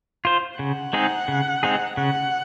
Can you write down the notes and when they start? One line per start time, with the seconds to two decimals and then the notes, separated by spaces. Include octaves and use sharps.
0.25 F4 C5
0.59 C#3 F#5
0.93 G#3 C4 D#4 G#4
1.28 C#3
1.63 G#3 C4 D#4 G#4
1.97 C#3 F#5